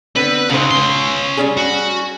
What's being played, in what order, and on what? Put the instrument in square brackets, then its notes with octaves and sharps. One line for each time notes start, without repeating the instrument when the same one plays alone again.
[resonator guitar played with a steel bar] D3 B3 C4 [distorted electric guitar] B4
[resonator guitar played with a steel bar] C#3 C5 [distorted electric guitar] D#4 F#4
[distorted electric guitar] C#4 C6
[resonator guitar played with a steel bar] G3 C#4 G#4
[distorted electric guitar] F#4